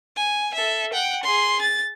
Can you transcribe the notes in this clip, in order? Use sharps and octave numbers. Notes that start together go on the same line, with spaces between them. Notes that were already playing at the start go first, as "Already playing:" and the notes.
G#5
A4 E5
F#5 G5
G#4 C6
A6